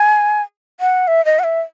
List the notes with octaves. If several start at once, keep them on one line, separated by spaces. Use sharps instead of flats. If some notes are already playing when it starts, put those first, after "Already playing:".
Already playing: G#5
F#5
E5
D#5
F#5
E5